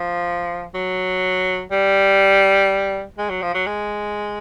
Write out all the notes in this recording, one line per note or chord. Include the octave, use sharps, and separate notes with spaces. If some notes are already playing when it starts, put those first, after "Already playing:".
Already playing: F3
F#3
G3
G#3
F#3
F3
F#3
G#3